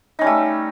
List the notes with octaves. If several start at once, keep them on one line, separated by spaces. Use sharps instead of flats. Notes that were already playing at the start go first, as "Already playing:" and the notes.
G3 A3 C#4 D#4